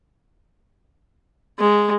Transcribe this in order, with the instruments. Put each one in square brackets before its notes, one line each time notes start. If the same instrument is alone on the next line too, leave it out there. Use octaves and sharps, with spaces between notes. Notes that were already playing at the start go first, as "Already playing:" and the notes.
[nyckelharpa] G#3